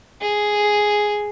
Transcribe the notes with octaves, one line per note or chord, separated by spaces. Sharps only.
G#4